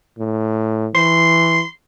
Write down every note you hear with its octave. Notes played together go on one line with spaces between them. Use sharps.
A2
E3 C6